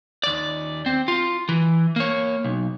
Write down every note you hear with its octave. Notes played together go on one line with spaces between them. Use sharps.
D#2 D5
C4
F4
E3
A#3 C#5
B1